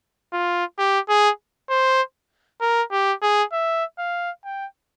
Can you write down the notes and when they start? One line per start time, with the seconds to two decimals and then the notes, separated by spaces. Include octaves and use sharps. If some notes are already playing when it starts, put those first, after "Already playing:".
0.33 F4
0.78 G4
1.09 G#4
1.70 C5
2.61 A#4
2.92 G4
3.22 G#4
3.52 E5
3.98 F5
4.45 G5